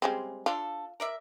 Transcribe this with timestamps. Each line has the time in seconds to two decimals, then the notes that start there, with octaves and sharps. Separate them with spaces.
0.02 C#3 G3 G#3 C4
0.46 D4 F4 A4
1.00 A#4 D5 E5